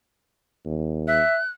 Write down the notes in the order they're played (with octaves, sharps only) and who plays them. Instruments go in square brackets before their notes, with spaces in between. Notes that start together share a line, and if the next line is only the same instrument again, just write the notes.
[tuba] D#2
[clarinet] E5 [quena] F#6